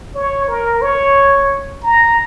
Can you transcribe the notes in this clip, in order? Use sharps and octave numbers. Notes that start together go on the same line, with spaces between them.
C#5
A#4
C#5
A#5